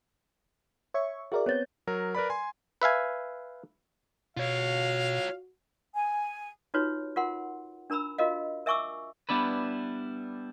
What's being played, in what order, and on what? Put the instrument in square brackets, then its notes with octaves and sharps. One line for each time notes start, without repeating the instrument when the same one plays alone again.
[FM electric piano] C#5 E5 C#6
[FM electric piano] F#4 A#4 D5 [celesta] G#4 E5
[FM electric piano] B3 C4 G6 [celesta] C#5 A6
[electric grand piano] F#3 A#4
A#4 B4 D5 B5
G#5 C6
[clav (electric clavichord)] B4 E5 F5 G#5
[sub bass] B2 [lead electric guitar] F4 C#5 [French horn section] F#4 [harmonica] F5
[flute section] G#5
[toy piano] D#4 F4 F#4 B4 C#5
F4 A#4 F#5 C6
D4 A#4 A#5 B5 E6
F4 F#4 A#4 D#5 F5
A#4 E5 G#5 C#6 D6 E6
[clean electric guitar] G3 B3 D4 E4 B4